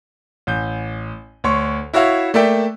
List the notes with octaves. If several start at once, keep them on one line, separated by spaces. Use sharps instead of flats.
A1 G6
D2 C#5 C6 C#6
E4 F#4 C#5 E5 F5
A3 A#3 D5 E5 G5